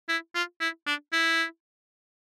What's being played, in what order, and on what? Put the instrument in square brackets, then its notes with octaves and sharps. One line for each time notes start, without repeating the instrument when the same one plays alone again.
[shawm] E4
F4
E4
D4
E4